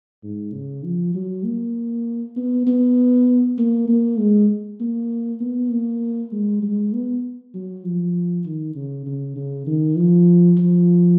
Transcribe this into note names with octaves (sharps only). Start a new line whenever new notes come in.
G#2
C#3
F3
F#3
A#3
B3
B3
A#3
A#3
G#3
A#3
B3
A#3
G#3
G#3
B3
F#3
F3
D#3
C#3
C#3
C#3
D#3
F3
F3